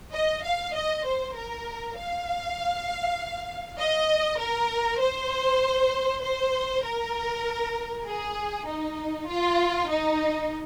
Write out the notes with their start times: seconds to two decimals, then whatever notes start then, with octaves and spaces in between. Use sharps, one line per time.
0.14 D#5
0.43 F5
0.75 D#5
1.04 C5
1.35 A#4
1.96 F5
3.79 D#5
4.40 A#4
5.01 C5
6.23 C5
6.85 A#4
8.06 G#4
8.66 D#4
9.28 F4
9.89 D#4